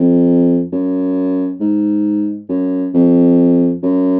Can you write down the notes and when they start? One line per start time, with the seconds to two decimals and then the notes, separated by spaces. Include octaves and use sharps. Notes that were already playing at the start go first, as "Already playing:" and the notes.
Already playing: F2
0.72 F#2
1.60 G#2
2.49 F#2
2.94 F2
3.83 F#2